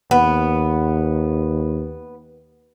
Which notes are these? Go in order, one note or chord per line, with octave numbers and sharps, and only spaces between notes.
D#2 B3